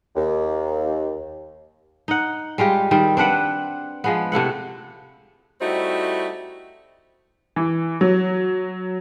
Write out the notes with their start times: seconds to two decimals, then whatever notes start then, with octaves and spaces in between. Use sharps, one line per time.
0.16 D#2
2.08 D#4 F#5
2.58 G3 G#3 F4 G4
2.91 D#3 G3 C4
3.17 C4 D4 B4 F#5
4.04 F3 G#3 B3
4.32 C3 A3 E4 F#5
5.61 G3 A3 C4 D#4 E4 F#4
7.56 E3
8.01 F#3